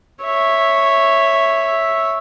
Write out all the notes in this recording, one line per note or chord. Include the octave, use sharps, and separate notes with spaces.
C#5 E5